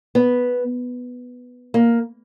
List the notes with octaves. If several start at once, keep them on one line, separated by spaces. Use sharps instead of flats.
B3
A#3